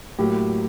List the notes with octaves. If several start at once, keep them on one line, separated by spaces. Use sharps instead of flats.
A2 F#3 A#3 G4